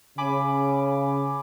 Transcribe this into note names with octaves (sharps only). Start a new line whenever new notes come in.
C#3 G#5 B5 D6